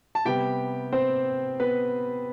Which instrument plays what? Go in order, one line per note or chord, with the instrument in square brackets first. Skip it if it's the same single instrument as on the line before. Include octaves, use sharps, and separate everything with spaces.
[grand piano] A5
C3 G3 B3 G4 G5
C4 C5
B3 B4